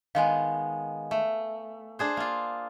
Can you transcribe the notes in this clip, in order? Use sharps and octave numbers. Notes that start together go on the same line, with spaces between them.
D#3 G#3 B3 F5 G#5
A3
D4 G#4 C5
A#3 F4